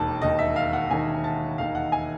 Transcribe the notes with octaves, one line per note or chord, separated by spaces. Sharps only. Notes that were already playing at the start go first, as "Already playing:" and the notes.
Already playing: E1 D#2 D#3 A5
E1 D#2 D#3 D#5
E5
F5
F#5
E1 D#2 D#3 G#5
A5
E1 D#2 D#3 F5
F#5
G#5